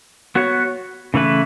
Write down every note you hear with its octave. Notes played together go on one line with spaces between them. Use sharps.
B3 F#4 C#5
C#3 E3 A3 E4 B4